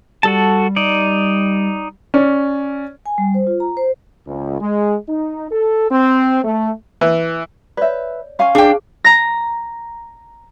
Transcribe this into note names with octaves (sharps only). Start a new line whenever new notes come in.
G3 F#4 A4 A5
D#4 D5
C#4 D5
G#5
G3
C5
F4
A#5
C5
C#2
G#3
D#4
A4
C4
A3
E3
B4 C#5 D5 E5
C#4 F5 G#5 C6 C#6
D4 G#4 G5
A#5 A#6